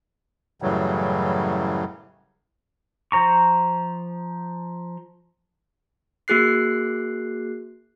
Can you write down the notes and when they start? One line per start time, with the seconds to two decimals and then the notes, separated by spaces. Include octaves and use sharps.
0.62 F#2 A2 C#3 E3 F#3 G3
3.12 F3 C5 A#5 C#6
6.28 A#3 F#4 G#4 F#6 C7